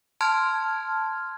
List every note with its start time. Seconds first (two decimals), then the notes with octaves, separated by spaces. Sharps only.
0.21 A5 C6 F6 G#6